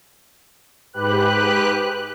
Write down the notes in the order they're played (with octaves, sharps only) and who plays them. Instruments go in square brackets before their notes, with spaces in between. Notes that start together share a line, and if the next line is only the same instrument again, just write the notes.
[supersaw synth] G#2 G4 B4 F#6